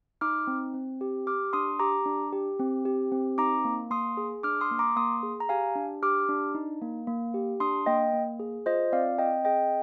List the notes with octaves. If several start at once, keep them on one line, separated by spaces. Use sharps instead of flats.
D#4 D6 F6
C4
C4
G4
G4 D6 F6
D4 C6 D#6
G4 A#5 D6
D4
G4
C4
G4
C4
D#4 A#5 D6
A#3
A#3 C6 D#6
G#4
D4 D6 F6
C6 D#6
A#3
A#5 D6
A#3 C6 D#6
G#4
A#5
G4 F5 G#5
D4
G4 D6 F6
D4
D#4
A#3
A#3
G4
D4 C6 D#6
A#3 D#5 G5
A#3
G#4
F4 C5 D#5
C4 D5 F5
C4 D#5 G5
G#4 D#5 G5